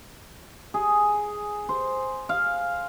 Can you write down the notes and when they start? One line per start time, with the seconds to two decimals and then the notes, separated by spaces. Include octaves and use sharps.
0.74 G#4
1.69 C5
2.29 F5